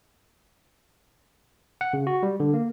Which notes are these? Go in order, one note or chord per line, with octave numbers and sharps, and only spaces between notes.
F#5
C#3
F#4
G3
D3
A#3